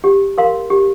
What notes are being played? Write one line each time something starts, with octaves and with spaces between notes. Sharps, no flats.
G4
A#4 F5 C6
G4